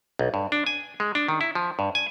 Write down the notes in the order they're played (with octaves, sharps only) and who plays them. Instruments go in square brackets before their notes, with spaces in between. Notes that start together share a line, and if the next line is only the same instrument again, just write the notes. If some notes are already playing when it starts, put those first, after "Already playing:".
[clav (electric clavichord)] B1
G2
D4
G#5
G#3
D4
D#3
E4
F3
G2
G#5